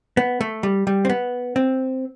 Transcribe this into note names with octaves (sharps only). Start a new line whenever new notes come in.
B3
A3
G3
G3
C4
B3
C4